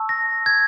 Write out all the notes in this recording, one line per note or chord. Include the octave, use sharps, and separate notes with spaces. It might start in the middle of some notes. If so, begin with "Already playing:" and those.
Already playing: A5 C#6 E6
A#6
G#6